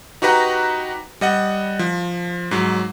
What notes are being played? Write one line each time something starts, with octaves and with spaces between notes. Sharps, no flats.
D#4 F#4 G4 B4 F#5 A#5
G3 D#5 F#5
F3
G#2 F#3